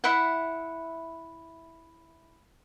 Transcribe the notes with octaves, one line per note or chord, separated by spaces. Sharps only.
E4 E5 F#5